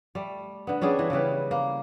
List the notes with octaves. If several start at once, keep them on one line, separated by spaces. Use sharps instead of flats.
G3 A3
D3 B3
G3 C#4 D4 G#4
E3
C#3 E3 G3 B4
A#3